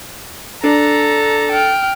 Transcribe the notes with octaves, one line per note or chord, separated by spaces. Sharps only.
D4 A4 A#5
G5 F6